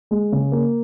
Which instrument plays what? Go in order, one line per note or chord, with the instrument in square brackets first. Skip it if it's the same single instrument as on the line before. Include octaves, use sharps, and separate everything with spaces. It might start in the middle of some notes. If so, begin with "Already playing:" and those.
[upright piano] G#3
C#3
A#3